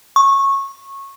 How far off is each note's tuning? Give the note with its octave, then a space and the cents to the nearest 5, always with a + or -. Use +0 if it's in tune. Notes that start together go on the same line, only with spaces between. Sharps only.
C#6 -15